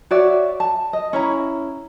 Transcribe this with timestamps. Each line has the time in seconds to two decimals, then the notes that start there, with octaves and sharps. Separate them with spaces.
0.11 F#4 C#5 D5 E5
0.60 A5
0.93 D#5
1.13 C#4 E4 A#5